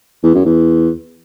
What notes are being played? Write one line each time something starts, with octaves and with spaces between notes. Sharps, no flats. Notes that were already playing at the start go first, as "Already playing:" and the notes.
E2
F#2
E2